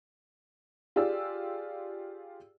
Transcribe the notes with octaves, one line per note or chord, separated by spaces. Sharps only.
F4 G4 G#4 D5 E6